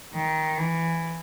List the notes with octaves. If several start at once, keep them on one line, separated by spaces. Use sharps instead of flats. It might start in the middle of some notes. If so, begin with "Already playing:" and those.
D#3
E3